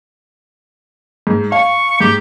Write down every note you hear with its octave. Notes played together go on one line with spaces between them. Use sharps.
G#2
F5 C#6
G#2 G4